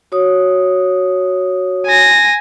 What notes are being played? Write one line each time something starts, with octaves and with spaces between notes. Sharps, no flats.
F#4 C#5 D#6
G#5 A#6